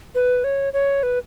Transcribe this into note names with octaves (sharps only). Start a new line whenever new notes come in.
B4
C#5
C#5
B4